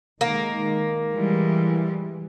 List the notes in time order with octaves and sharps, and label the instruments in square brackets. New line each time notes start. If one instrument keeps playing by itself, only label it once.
[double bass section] D#3 G#3 [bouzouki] A#3
[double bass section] E3 [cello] G3 G#3